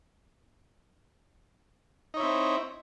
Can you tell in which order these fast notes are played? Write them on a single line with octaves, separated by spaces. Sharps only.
D#4 C#5 E4 C4